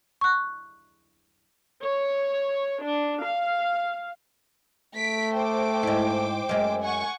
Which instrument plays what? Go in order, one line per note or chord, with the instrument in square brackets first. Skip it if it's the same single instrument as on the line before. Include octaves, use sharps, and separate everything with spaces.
[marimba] C#6 F#6
[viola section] C#5
D4
F5
[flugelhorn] A3 [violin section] B6 D7
[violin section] C5 G5 D6
[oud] G#2 E4
F#2 G#3
[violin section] F#5 G#5 C#6